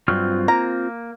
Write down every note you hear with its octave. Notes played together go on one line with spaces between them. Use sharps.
G2 F#3 C4 F4 F6
A#3 A#5